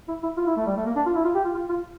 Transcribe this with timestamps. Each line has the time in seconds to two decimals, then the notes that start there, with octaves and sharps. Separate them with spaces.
0.08 E4
0.23 E4
0.37 F4
0.47 E4
0.57 A3
0.66 G3
0.76 A3
0.86 A#3
0.96 D4
1.06 F4
1.15 E4
1.25 F4
1.35 G4
1.44 F4
1.55 F4
1.69 F4